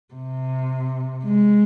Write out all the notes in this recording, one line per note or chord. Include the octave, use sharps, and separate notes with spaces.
C3
G#3